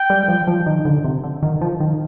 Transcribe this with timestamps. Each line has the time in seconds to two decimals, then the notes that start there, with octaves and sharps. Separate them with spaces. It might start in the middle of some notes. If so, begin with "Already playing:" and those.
Already playing: G5
0.10 G3
0.28 F3
0.47 F3
0.66 D#3
0.85 D3
1.04 C3
1.24 D3
1.43 D#3
1.61 F3
1.80 D#3